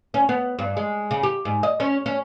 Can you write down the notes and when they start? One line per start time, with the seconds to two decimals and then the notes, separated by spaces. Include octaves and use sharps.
0.14 C#4
0.29 B3
0.59 G2
0.77 G#3
1.11 C#3
1.23 G4
1.45 G#2
1.63 D#5
1.80 C#4
2.06 C#4